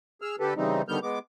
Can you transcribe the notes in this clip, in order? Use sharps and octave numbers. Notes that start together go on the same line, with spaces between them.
G#4 E6 F6
D3 G4 A4 B4
C#3 E3 G3 C4 D#4
D3 D#3 G3 B3 F6 G6
G#3 B3 D6